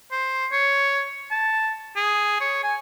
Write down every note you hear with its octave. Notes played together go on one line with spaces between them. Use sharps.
C5
C#5
A5
G#4
C#5
G#5